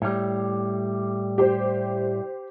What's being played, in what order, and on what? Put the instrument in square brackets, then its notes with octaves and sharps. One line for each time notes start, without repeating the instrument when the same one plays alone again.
[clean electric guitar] A2 G3
[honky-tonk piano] G4 C5